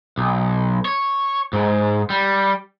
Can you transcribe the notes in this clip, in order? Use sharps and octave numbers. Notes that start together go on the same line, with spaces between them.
B1
C#5
G#2
G3